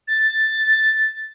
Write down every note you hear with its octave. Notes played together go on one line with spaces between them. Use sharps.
A6